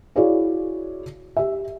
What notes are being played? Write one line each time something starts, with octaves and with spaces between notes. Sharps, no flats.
E4 F#4 G#4 C#5 D5 F5
G4 E5